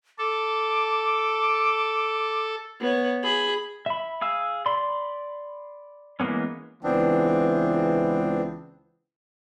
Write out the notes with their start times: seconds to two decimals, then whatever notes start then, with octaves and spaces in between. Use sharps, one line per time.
0.18 A4 D6
2.81 B3 C#5
3.23 G#4 B5
3.86 E5 B5
4.21 G#4 F5 E6
4.66 D5 B5 C6
6.20 E3 G#3 A#3 B3 C#4
6.84 C#2 E3 B3 C4 D4